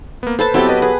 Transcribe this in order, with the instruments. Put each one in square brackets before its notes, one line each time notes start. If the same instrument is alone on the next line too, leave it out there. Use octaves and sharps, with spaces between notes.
[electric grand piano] A#3 B3
[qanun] A4 B4 A5 [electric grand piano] C5
[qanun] F#3 B3 G4 [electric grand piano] C4 E4 A4
[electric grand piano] B4 D#5 A5
[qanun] G#4 [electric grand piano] B4